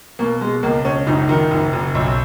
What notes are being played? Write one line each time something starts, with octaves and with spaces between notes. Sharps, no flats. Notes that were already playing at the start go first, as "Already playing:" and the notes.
B2 A#3
B2 G#3
C#2 A#3
C#2 C#4
F#1 D#4
D#3
F#1
F#1
B1